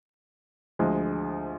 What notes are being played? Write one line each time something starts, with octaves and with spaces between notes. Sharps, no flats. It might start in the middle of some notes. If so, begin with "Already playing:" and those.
D2 D3 F3 G#3